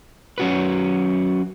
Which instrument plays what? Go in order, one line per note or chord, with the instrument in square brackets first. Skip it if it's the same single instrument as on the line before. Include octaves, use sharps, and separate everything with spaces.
[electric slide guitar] F#3 C#4 F#4 B4